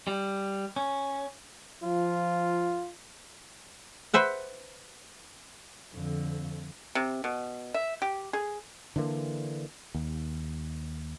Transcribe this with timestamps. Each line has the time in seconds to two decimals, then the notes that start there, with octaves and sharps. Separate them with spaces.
0.07 G3
0.76 C#4
1.84 F3 F4
4.14 B4 C5 E5 F#5
5.95 F2 D3
6.95 C3
7.24 B2
7.74 E5
8.02 G4
8.33 G#4
8.96 D3 E3 A3 A#3
9.95 D#2